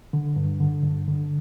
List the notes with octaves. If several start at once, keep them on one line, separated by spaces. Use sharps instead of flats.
D3
G2
D3
G2
D3